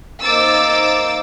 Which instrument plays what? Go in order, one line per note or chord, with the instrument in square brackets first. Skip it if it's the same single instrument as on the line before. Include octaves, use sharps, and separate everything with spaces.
[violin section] A#3 D#4 C5 D6 E6 A6